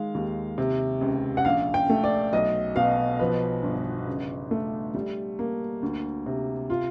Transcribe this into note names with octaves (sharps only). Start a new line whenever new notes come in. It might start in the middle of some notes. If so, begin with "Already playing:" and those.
Already playing: D#3 G#3 F5
D#2
C3
C#2
F#5
A#1 F5
G5
A3
D5
B1 D#5
B2 F5
F3 B4
G1
C#3
A3
G3
A#3
D2
C3
F4